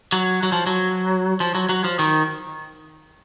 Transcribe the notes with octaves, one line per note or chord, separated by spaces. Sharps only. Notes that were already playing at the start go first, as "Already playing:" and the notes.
F#3
F#3
F3
F#3
F3
F#3
F#3
F3
D#3